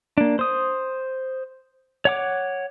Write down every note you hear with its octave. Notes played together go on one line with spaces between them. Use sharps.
A#3 D4
C5 D#6
C#5 F#5 D6